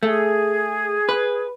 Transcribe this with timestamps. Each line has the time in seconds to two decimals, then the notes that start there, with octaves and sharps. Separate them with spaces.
0.03 A3 G#4
1.09 B4